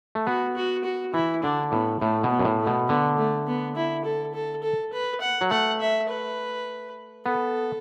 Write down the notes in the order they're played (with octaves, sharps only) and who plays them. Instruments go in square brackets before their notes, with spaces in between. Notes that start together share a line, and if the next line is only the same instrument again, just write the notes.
[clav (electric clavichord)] A3
[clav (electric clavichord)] B3 [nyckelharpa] F#4
[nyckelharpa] F#4
F#4
[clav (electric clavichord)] E3 [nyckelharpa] E4
[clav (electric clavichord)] D3 [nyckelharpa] D4
[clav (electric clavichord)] A2 [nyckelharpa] B3
[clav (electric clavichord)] A2 [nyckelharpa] A3
[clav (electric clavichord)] B2
[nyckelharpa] B3
[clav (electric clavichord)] F#2
A2
[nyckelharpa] A3
[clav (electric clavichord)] B2
[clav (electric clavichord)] D3 [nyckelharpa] B3
[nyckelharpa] A3
B3
E4
A4
A4
A4
B4
F#5
[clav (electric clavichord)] F#3
[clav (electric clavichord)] A3 [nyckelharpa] F#5
[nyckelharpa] E5
B4
[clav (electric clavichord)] B3 [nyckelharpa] A4